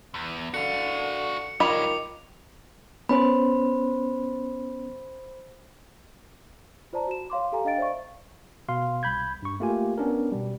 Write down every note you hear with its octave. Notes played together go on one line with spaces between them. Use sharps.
E2
D3 F#4 F5 C#7
D#3 G3 F4 C#5 D#5 B5 D6
B3 C#4 C5 B5
F4 C5 D5 A5 A#5
F#4 E7
C#5 F5 C6 D6
G4 A4 F5 G#5 A#5
D4 D#5 F5 G5 A6 D7
C5 D5 E5 F5 C#6
B2 F5 C6
C2 B5 G6 G#6
G2 C#6
A3 A#3 F4 G4 G#5
B3 C#4 D4 A#4
B2 G3